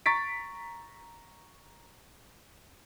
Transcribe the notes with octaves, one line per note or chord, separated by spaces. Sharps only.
A#5 C#6 A6 B6 D7